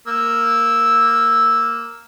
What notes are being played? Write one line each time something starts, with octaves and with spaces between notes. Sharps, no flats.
A#3 E6